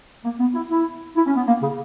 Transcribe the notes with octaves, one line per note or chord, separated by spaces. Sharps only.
A#3
B3
E4
E4
E4
C#4
B3
A#3
C#3